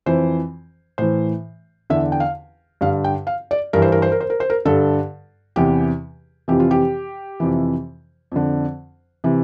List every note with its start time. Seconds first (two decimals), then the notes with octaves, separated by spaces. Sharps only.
0.06 F2 E3 C5
0.98 A2 E3 C5
1.90 E2 D3 E5
2.12 G5
2.20 F5
2.81 G2 D3 F5
3.04 G5
3.27 F5
3.51 D5
3.73 G2 E3 A#4
3.82 C5
3.92 A#4
4.02 C5
4.12 A#4
4.20 C5
4.30 A#4
4.40 C5
4.50 A#4
4.65 G2 D3 A4
5.56 E2 C3 E3 G4
6.48 F2 C3 E3 G4
6.60 F4
6.71 G4
7.40 F2 C3 E3
8.32 F2 D3
9.24 C3 E3